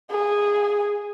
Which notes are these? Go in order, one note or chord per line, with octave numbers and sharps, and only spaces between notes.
G#4